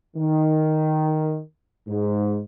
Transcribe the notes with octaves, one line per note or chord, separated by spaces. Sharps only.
D#3
G#2